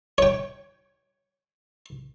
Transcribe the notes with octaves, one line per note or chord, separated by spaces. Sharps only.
C#5 G5